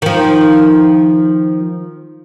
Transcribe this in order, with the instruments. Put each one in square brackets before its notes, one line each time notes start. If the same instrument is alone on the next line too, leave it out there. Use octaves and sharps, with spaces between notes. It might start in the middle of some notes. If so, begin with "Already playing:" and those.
[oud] D#3 F3